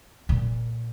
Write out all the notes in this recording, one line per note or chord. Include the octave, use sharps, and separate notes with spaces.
A#2